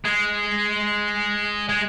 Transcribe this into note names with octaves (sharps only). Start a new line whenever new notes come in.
G#3
G#3